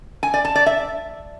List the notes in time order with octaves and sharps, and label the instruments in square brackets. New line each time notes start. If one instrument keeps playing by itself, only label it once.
[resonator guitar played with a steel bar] G#5
D5
A5
D5
E5